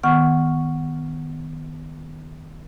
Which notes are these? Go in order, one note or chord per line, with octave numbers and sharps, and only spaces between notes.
D#3 B3 F#5 C#6 F6